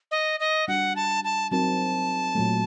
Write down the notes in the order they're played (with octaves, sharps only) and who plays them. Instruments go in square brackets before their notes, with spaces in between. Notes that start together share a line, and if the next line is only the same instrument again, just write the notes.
[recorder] D#5
D#5
[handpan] G3 D4 F#4 [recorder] F#5
[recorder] A5
A5
[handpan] F#3 C4 D#4 F#4 A#4 [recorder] A5
[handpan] A#2 F#3 A3